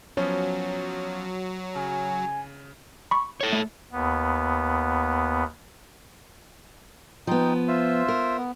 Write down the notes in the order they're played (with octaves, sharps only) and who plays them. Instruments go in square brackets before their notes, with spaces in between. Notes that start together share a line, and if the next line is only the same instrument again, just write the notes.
[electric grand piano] F3 B3 C#4 [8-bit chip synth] F#3 [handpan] C#5
[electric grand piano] C#3 [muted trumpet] G#5
[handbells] B5 C#6
[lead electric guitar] A4 C#5
[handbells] A3
[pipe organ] D#2 B3
[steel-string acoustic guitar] F3 B3 [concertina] D#4 G5
[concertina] F4 C5 E5
[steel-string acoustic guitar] A#4
[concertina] B3